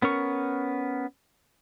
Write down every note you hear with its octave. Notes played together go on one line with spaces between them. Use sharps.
B3 C#4 A#4 C#6